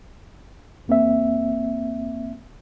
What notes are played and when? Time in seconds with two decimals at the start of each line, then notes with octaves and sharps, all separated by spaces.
0.88 E2 A#3 C4 E5